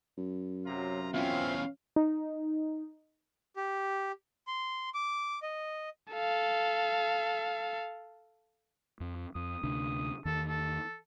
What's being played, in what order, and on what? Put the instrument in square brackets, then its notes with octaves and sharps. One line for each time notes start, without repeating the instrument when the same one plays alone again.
[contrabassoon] F#2
[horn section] C3 F4 A#5 [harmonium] F#3
[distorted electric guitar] E2 C#4 [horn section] B2 F5 [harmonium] C4 F4 E5
[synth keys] D#4
[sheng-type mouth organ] G4
C6
D6
D#5
[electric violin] A4 F5
[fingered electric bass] F2
[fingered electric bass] F2 [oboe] D#6
[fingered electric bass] D2 C3 D4
[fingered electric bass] E2 D#3 [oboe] A4
[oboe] A4